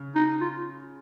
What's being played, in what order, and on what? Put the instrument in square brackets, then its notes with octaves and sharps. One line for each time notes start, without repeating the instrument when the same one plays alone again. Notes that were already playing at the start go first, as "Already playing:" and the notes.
Already playing: [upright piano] C#3
[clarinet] D#4
F4